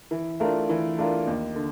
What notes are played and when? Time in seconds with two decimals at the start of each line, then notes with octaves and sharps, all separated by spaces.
0.11 E3
0.40 A3 D4 F4 A#4
0.69 E3
0.98 A3 D4 F4 A#4
1.27 D#2
1.55 D3